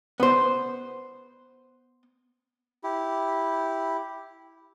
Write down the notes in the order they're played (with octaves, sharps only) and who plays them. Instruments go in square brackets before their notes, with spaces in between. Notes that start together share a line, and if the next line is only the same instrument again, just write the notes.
[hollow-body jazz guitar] B3 C5
[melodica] E4 G4